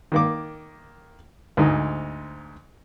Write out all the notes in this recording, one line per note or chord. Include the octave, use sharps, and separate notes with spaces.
D#3 A#3 D6
D2 G#2 D#4